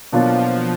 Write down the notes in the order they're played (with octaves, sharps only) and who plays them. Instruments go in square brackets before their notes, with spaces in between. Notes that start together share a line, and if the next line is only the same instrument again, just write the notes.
[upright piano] B2 F#3 A#3 D4 F4 [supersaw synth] F3